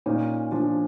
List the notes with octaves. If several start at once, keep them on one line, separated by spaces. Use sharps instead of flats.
A#2 C#4 D#4
F3 D4